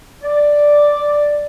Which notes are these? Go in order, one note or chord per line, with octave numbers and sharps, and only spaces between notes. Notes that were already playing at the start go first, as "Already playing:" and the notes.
D5